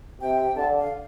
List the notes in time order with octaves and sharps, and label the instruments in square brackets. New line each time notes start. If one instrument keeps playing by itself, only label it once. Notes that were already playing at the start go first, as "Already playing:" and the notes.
[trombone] C3 [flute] G5
[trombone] D3 [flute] A5
[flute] F5